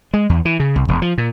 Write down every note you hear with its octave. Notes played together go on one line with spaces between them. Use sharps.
G#3
E2
E3
C#3
C2
E1
F3
A#2